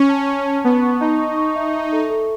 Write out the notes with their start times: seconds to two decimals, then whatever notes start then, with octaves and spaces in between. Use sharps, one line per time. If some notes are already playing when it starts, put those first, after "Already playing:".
Already playing: C#4 C#6
0.09 A5
0.27 C#6
0.46 A5
0.64 B3 A5
0.82 C#6
1.00 D#4 A5
1.18 C#6
1.37 C#6
1.55 E5
1.74 E5
1.92 A4
2.10 A4